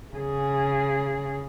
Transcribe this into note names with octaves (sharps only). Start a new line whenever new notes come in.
C#3 G#4